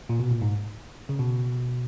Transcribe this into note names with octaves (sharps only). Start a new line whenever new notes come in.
A#2
B2
A#2
G#2
C#3
B2